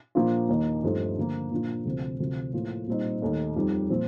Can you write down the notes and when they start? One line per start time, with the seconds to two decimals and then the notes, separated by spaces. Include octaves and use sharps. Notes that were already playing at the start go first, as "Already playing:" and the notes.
0.15 A#2 F3 A#3 D4 F4
0.49 D#2 D#3 A#3 D#4
0.83 G2 F3 A3 C4 D#4
1.18 D3 F3 A#3
1.51 A#2 F3 A#3 D4 F4
1.85 D2 C3 F3 C4
2.20 D2 C3 F3
2.53 A2 F3 A#3 F4
2.87 A#2 G3 C4 D#4
3.22 D#2 D#3 A3 D#4
3.56 F2 D#3 G3
3.90 A#2 F3 C4